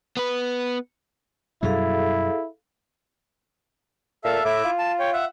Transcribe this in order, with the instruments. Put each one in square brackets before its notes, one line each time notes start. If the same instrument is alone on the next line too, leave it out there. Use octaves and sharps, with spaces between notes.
[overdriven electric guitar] B3 B4
[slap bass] F#2 B2 G3 [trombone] E4 [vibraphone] G#4 A4 F5
[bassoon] A#2 [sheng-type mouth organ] A4 E5 F5
[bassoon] A2 [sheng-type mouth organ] E4 E5 D6
[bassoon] F4
[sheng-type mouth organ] A5
C#5 G5
E5 F#5